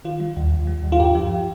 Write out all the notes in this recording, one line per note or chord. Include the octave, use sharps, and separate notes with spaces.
D#3 F4
G3
D#2
D#2
G3
D#2
F4
G2 G4
F3